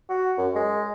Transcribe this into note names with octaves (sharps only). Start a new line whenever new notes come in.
F#4
F#2
G#3